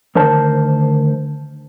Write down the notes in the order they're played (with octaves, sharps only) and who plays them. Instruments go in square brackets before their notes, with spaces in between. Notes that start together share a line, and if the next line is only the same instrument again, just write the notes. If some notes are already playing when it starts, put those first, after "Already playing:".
[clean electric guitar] D2 D#3 A#4 C5 A5